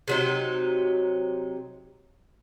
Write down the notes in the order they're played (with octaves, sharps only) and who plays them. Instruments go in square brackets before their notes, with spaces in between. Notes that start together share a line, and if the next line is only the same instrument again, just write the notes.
[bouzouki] C3 F#3 D#4